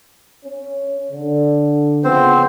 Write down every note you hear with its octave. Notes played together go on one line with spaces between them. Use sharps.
C#4
D3
C#3 F3 B3 C4 C5